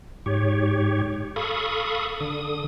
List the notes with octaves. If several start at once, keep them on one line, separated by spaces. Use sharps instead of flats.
G#2 G4 C#5
A4 F5 B5 C#6 D#6
D3 D#6